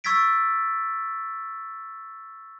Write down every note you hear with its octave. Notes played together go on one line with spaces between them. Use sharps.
C#6 E6 G#6 A6 B6 D7